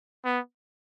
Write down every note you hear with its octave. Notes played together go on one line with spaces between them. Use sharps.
B3